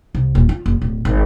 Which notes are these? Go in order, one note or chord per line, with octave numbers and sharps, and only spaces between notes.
C2
D#1
F4
F#1
D1
G#1